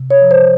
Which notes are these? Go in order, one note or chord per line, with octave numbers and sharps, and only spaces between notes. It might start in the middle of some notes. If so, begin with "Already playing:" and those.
Already playing: C3
C#5
F3
C5